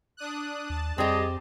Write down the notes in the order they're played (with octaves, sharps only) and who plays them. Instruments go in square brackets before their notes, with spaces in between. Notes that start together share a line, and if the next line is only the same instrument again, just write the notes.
[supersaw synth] D4 D#6 F#6
[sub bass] D#2 [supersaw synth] A5
[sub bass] F2 [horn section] G3 G#4 D#5 [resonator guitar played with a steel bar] C4 G4